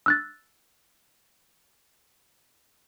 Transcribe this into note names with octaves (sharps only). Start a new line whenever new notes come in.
E6 F#6 A6